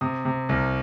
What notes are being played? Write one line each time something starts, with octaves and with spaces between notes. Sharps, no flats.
C3 D#6
C3
C2